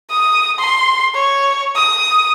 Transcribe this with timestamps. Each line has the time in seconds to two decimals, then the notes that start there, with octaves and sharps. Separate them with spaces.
0.10 D#6
0.59 C6
1.14 C#5
1.76 D#6